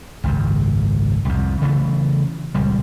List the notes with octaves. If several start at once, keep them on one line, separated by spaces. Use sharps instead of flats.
G#1 C#2 F#2
C2 F2
C#3 E3 A3
D#1 C#2 G3